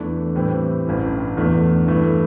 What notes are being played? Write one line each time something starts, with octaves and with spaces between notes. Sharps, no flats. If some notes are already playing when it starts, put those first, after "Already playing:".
Already playing: E2 E3 A3 D4
A2 E3 G3 C4
A1 G2 E3
E2 E3 A3 D4
G2 E3 A3